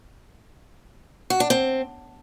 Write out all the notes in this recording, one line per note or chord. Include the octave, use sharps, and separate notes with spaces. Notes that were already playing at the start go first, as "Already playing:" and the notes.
F#4
D4
C4